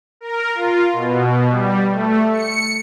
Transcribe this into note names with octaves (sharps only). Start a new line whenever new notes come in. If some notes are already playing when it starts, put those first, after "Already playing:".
A#4
F4
B2
G3
A3
C#7